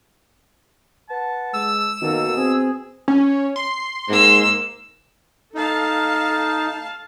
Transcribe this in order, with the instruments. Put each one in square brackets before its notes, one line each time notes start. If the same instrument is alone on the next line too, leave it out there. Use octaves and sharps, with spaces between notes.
[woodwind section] B4 F#5 A5
[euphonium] G#3 [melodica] E6
[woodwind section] F#2 A#3 A4 [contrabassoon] B2 [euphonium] D#3
[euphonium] C4 [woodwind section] G#4
[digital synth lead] C#4
C6
[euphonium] G#2 [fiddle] A#3 E6
[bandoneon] D#4 [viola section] A4 F5 A5